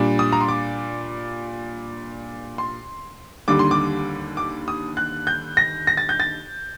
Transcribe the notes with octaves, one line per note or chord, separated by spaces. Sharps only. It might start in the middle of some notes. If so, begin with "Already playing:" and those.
Already playing: A#2 G3 D4
D#6
A#5
C6
D6
C6
D#2 D3 G3 D6
C6
D6
D6
D#6
F#6
G6
A#6
A#6
A6
G6
A6